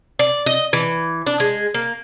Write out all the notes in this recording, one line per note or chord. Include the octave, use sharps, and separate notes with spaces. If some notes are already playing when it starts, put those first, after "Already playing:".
D5
D#5
E3
D4
G#3
A#3